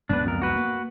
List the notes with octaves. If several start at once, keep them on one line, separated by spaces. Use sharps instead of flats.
C#2 F#2 B3 D4 B4
F2 A#4
F#4 B4
A#3